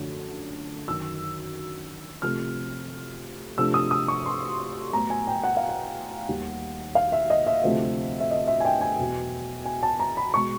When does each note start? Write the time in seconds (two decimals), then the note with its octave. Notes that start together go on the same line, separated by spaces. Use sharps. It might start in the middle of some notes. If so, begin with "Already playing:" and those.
Already playing: F#2 D3 F3 A3 D4
0.87 F#2 D#3 F#3 E6
2.22 C3 F3 A3 C4 F6
3.58 C3 F3 A3 D4 E6
3.74 D#6
3.91 D#6
4.08 C#6
4.26 C6
4.93 A2 F#3 B3 A#5
5.10 G#5
5.27 G5
5.43 F#5
5.57 F5
5.69 F#5
6.28 D#2 D#3 G3
6.95 F5
7.12 E5
7.30 D#5
7.47 E5
7.63 D2 C3 F3 A3 C4
8.20 E5
8.31 D#5
8.47 E5
8.60 G#5
8.65 G5
8.81 G#5
8.99 E2 B2 F#3 B3
9.66 G#5
9.83 A5
10.00 A#5
10.17 B5
10.34 B2 G#3 C#6